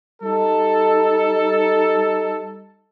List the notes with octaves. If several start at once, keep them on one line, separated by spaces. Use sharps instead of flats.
G3 D#4 A4